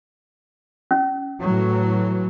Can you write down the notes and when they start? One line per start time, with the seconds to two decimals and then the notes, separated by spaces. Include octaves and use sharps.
0.91 C#4
1.41 A2 E3 F#3